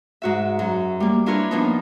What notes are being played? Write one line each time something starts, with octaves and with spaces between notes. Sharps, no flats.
G#2 F#4 E5
F#2
G3 A#3
D4 E4 F4 A#4 B4 C#5
F3 A#3 B3 D4 D#4